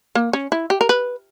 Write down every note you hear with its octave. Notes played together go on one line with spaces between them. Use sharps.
A#3
C#4
E4
G4
A#4
B4